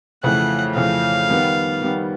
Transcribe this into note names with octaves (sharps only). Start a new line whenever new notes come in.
F2 C#3 E3 A3 F#5
F2 C#3 E3 A3 F5
D#3 G3 B3
D#3 G3 B3